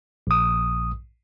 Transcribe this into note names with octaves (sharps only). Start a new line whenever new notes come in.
A#1 D#6